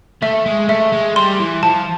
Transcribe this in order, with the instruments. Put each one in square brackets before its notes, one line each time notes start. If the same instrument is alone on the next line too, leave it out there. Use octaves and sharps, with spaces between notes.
[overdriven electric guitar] A3 [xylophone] E5
[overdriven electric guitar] G#3
[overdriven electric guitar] A3 [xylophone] E5
[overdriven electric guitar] G#3
[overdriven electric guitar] G3 [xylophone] C6
[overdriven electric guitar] E3
[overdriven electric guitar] F3 [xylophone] A5